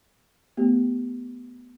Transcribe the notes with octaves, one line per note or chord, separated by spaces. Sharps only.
A3 B3 G4